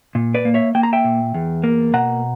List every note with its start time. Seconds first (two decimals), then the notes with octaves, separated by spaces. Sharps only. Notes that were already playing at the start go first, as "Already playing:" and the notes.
0.15 A#2
0.35 B4 D5
0.45 A#3
0.54 C#5 E5
0.75 A#3 G5
0.83 A#5
0.93 E5 G5
1.04 A#2
1.34 E2
1.64 A#3
1.94 B2 F#5 A#5